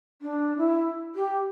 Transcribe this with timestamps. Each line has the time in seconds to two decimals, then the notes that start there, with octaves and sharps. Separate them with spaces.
0.22 D4
0.58 E4
1.15 G4